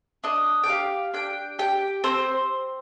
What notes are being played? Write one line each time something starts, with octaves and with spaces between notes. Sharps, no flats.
D4 D#5
G5
G4 F5
D4 G5
G4 G5
C4 C5